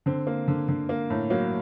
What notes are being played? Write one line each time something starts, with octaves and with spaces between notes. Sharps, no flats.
D3 C4
A#3
D3
D3
A#3
A2
F#3 A#3